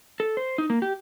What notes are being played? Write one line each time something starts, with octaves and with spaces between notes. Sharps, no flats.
A4
C5
D#4
A#3
G4